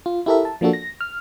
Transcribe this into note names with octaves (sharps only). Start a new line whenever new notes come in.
F4
E4 G4 A4 A#4 E5
A5
F3 A#3 D4 F#4 A4
A#6
F6